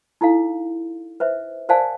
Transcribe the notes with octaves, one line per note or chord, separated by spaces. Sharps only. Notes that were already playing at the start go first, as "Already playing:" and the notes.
D#4 E4 A4 F5
B4 C5 E5
A#4 C5 D5 F5 G#5 A5